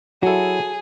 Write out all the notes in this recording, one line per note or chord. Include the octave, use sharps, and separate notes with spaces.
F#3 E4 F#4 G#4 A4